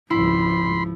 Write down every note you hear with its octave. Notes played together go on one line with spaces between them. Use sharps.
G#1 C#2 F3 E4 B5 C6